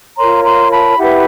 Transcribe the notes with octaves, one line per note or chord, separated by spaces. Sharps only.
F4 A#4 C#5 A#5 C6
A#5 C6
A5 B5
E4 G4 B4 E5 F#5